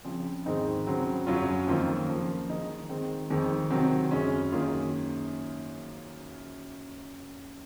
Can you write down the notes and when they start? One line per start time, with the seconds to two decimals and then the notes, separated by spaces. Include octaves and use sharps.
0.05 C#3 F3 C4
0.46 G#2 D#3 G#3 C4 D#4
0.87 C#3 F#3 C4
1.27 F#2 C#3 F#3 C#4 F4
1.67 F2 D#3 A#3 F4
2.08 C#3 F3 A#3
2.49 D#3 G#3 D#4 G#4
2.89 D#3 G#3 C4
3.30 F2 D#3 G#3
3.71 C3 D#3 F#3 C4
4.11 F#2 C#3 G#3 C#4
4.52 F#2 D#3 A#3 F4 G#4